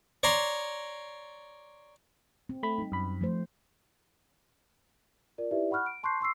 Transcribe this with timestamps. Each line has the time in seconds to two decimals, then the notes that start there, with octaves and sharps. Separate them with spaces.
0.23 C#5 D5 A#5 C6
2.49 C4
2.63 A3 B5
2.78 G3 D#4
2.92 F#2 B5
3.21 F3 A3 C5
5.38 F4 A#4 D5
5.51 D#4 E4 G4 B4 D5 E5
5.71 F#5 B5 C#6 F6 F#6
5.86 D7
6.03 A5 C6 C#6 F#6 G6 C7
6.20 C6 C#6 E6 C7